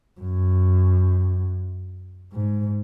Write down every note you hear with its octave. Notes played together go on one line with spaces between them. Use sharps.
F#2
G#2